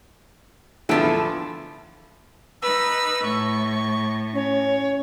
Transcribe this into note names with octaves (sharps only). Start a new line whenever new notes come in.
E2 A2 D3 E3 F3 E5 A5 D7
D#4 B4 E6
A2 C#6
C#4 C#5